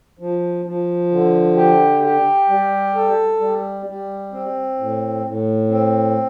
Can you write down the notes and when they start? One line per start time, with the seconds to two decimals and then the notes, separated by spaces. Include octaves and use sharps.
0.19 F3
0.65 F3
1.11 D3
1.56 G4
2.03 G4
2.49 G3
2.95 A4
3.40 G3
3.86 G3
4.32 C4
4.78 A2
5.24 A2
5.70 C4